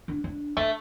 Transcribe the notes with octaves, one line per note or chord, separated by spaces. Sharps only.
D4
D4
A3 D4